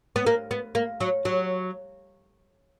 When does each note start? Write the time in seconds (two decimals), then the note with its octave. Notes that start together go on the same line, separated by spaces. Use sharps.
0.16 B3
0.26 A#3
0.51 B3
0.75 A#3
1.00 F#3
1.25 F#3